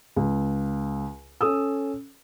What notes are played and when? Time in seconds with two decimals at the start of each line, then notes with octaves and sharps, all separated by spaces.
0.16 C#2
1.41 C#4 A4 D#6 E6